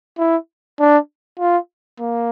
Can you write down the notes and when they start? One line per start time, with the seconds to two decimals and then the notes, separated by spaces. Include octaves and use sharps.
0.18 E4
0.80 D4
1.40 F4
2.00 A#3